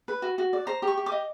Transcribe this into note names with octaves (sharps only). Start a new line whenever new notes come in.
B4
F#4
F#4
D5
C5 A#5
G4
C#6
G4
D6
D#5